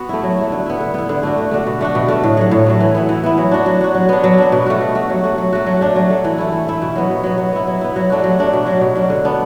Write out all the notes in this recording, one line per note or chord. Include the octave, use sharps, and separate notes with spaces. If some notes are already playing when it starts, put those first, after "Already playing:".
Already playing: B3 F#4
A3 E4
F#3
A3 E4
D3
B3 E4
D3
B3 E4
D3
A3 D4 F#4
D3
A3 D4 F#4
B2
A3 D4 F#4
B2
A3 D4 F#4
A2
F#3 A3
A2
F#3 A3
E3
B3 E4
E3
B3 E4
F#3
D4 F#4
F#3
D4 F#4
F#3
B3 D4
F#3
B3 D4
B2
A3 F#4
B2
A3 F#4
F#3
A3 F#4
F#3
A3 F#4
F#3
A3 D4
F#3
A3 D4
E3
A3 E4
E3
A3 E4
B2
F#3 B3
B2
F#3 B3
F#3
B3 E4
F#3
B3 E4
F#3
A3 D4 F#4
F#3
A3 D4 F#4
B2
F#3 D4
B2
F#3 D4
D3
B3 D4